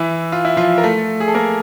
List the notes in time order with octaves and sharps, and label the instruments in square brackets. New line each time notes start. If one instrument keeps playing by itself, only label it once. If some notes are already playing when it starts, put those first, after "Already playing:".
Already playing: [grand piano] E3 E4
F4
E4
F3 F4
A#4
A3 A4
G#4
A4
A#3 A#4